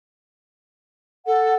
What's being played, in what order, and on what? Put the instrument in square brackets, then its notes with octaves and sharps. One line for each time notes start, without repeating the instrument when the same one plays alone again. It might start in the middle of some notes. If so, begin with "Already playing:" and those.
[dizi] A4 [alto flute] F#5